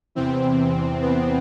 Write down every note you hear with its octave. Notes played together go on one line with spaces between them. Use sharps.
E2 C3 E3 C4
B3